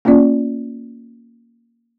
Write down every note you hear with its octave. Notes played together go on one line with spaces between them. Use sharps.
A#3 B3 C#4 F4 D5